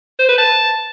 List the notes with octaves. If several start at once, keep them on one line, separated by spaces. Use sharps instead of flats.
C5
B4
A5